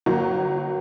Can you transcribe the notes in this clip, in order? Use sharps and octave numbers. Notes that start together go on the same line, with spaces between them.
G1 F#3 A#3 A#5